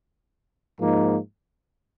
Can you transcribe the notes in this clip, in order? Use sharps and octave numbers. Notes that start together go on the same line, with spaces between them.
G#2 F3 A#3 D#4